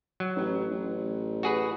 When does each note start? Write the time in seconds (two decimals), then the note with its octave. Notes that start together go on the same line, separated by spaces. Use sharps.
0.20 F#3
0.36 A1
0.71 A1
1.43 F#4 G#4 B4